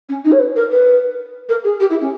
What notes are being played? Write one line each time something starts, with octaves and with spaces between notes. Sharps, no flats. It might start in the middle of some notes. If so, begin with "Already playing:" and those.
C#4
D#4
C#5
B4
A#4
B4
A#4
G#4
G4
E4
C#4